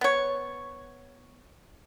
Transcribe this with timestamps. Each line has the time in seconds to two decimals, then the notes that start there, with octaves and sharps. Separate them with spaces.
0.01 B3 C#5